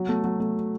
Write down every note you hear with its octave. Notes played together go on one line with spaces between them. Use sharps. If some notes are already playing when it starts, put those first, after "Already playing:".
Already playing: F#3
A3
F#3
A3